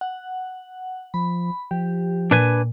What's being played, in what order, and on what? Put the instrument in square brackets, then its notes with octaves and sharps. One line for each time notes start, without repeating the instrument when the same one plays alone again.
[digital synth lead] F#5
[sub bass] F3 [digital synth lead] B5
[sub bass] F3 [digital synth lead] G4
[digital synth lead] A#2 [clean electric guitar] D4 B4 G#5